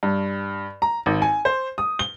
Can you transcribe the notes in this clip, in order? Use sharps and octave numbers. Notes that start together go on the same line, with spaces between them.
G2
A#5
G#1
G#5
C5
D#6
G7